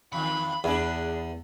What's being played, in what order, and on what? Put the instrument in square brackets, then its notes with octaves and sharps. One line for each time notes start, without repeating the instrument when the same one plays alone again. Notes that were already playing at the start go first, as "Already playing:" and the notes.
[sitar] E2 D#3 [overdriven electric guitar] B5
[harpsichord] E2 [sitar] D4 G#4